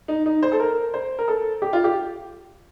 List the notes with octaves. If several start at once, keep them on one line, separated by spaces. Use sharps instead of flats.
D#4
D#4
C5
A4
A#4
C5
A#4
A4
G4
F4
G4